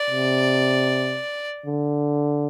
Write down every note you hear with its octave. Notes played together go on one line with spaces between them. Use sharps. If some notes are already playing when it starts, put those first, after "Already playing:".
Already playing: D5
C3
D3